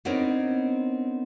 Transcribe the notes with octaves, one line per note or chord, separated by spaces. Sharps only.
B3 C4 D4 D#4 A#4 C#5